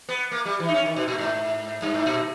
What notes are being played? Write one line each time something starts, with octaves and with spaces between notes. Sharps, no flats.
B3
A#3
G3
E3
D#4
C#4
D#3
B2
A#2
G#2
G2
G#2
A#2